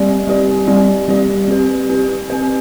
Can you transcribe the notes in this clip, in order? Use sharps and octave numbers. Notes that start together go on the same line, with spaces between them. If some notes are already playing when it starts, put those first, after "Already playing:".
Already playing: G3 C4 G4 D5
G3 C4 G4 D5
G3 C4 G4 D5
G3 C4 G4 D5
C4 G4 B4
C4 G4 B4
C4 G4 B4